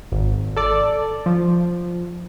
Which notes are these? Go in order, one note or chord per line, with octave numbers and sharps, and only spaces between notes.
G#1
A4 D5
F3